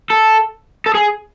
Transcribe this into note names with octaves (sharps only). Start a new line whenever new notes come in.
A4
A4
G#4